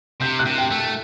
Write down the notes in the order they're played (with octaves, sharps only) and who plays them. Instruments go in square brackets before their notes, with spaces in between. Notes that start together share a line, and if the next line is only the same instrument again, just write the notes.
[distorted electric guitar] C3 [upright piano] G6
[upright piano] F#6
[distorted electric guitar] C3
[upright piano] G5
[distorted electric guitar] A3